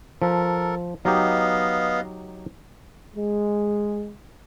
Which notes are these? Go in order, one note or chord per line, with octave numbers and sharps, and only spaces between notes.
F3 A4 A#4
F#3 B3 D#4 G4 D#5 F5
G#3